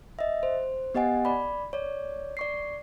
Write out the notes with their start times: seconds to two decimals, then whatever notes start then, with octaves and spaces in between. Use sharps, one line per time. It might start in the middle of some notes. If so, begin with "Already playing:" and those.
0.19 D#5 E5
0.43 C5
0.95 B3 G4 D#5 F#5 G#5
1.25 D5 B5
1.73 C#5 D5
2.37 D5 C#6 C7